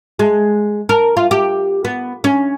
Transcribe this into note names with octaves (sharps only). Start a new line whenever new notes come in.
G#3
A#4
F4
G4
B3
C#4